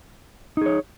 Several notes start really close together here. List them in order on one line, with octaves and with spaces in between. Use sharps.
D#4 G#4 C#5